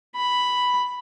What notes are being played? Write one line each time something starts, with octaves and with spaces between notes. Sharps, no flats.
B5